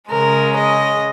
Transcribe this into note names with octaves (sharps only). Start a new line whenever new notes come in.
C#3 G#3 A#4
D#5